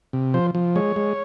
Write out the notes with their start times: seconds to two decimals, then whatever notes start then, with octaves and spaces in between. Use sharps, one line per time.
0.13 C3
0.34 F3 C5
0.55 F3
0.76 G#3 C#5
0.96 G#3